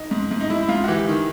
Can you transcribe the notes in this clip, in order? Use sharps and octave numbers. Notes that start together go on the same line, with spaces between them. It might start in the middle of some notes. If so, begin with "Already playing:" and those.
Already playing: D#4
G#2
G#2
D#4
G#2 E4
E4
G#2 F4
F#4
E3 G4
D#3